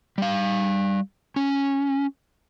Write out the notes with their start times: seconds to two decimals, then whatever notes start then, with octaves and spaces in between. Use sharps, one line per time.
0.18 G3 F5
1.36 C#4